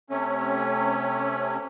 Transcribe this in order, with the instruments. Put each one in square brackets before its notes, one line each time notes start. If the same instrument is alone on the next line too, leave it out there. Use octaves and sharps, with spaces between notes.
[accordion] C3 A3 C#4